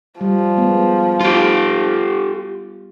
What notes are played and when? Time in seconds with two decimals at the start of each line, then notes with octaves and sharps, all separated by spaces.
0.21 F3 G3
0.58 G#3 B3
1.21 F4 G4